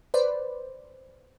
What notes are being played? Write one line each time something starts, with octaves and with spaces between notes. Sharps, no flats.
B4 C5 D5